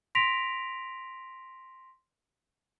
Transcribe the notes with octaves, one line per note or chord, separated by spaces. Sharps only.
C6 A#6 B6 D7 F7